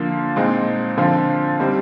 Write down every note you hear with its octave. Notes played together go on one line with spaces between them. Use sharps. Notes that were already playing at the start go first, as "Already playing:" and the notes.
Already playing: D3 F3 A#3 F4
A#2 G#3 C4 D#4
D3 F3 C4 F4
G3 C4 D#4